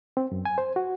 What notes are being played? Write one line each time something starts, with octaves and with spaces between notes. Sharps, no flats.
C4
F#2
G#5
C5
F#4